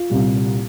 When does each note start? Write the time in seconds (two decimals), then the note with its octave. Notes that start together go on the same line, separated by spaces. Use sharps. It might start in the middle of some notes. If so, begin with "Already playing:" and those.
Already playing: F4
0.10 C2 A#2 G3